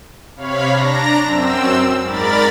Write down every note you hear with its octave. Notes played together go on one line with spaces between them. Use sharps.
C3 C#5 F5 B5
D4 A#5 A#6
F#2 C4 E6
G#2 A#4 D5 B5 A6